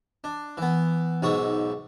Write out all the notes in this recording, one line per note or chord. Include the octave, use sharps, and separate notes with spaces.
D4
E3 B3
B1 G#2 E4 C#6 D#6